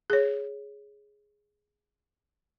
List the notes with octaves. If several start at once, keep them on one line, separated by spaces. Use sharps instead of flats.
G#4 C#5